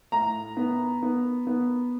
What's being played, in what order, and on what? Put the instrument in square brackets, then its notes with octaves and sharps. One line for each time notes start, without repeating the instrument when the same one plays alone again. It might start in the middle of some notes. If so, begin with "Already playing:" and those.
[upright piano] A2 A#5
B3
B3
B3